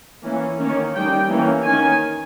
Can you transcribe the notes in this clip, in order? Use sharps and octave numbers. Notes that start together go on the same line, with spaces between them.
E3 A#3 C#4
D#3 A#3 C#4
D#3 G3 C#4 G5
E3 A#3 C#4
D#3 A#3 C#4 G#5